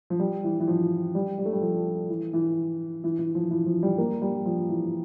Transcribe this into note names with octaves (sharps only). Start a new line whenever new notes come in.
F3
G3
E3
E3
F3
G3
G3
A3
G3
F3
E3
E3
E3
E3
F3
E3
F3
G3
A#3
G3
F3
E3